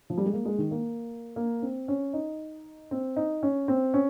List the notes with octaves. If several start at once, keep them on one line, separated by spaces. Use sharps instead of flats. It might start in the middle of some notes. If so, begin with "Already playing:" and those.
F3
G3
G#3
A#3
G#3
D#3
A#3
A#3
C4
C#4
D#4
C4
D#4
C#4
C4
C#4